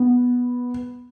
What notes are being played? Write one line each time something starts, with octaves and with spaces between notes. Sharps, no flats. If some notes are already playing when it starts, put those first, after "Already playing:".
Already playing: B3